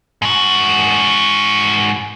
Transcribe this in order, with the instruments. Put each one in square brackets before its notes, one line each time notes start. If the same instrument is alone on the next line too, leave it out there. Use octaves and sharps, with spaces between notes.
[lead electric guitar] G#2 F#4